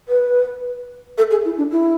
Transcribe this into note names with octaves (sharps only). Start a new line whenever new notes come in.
B4
A4
G#4
E4
D4
E4